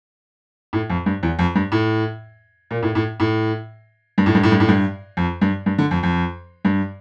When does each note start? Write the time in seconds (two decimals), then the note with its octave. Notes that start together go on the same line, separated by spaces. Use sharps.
0.73 A2
0.90 F2
1.06 G2
1.23 E2
1.39 F2
1.55 G2
1.72 A2
2.71 A#2
2.83 A2
2.95 A2
3.20 A2
4.18 G2
4.26 A2
4.35 G2
4.43 A2
4.52 G2
4.60 A2
4.69 G2
5.17 F2
5.41 G2
5.66 G2
5.78 D3
5.91 F2
6.03 F2
6.65 G2